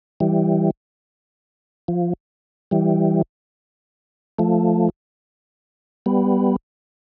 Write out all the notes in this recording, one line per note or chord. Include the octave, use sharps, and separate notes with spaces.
E3 G3
F3
E3 G3
F3 A3
G3 B3